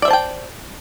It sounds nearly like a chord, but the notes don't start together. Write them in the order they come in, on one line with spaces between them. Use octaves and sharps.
D5 E5 C5 A5 G5